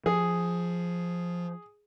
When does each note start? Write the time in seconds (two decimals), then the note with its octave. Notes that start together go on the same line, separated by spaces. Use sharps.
0.06 F3 G#4